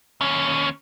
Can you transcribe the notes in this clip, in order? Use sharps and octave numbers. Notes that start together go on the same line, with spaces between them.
D#2 C#4